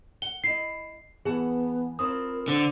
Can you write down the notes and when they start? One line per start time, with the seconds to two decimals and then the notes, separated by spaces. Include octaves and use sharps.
0.22 F#5 G7
0.44 E4 D#5 C7
1.25 E3 B3 G#4 F#5 A5
1.99 C4 E4 F4 A#4 D#6
2.48 D3 C5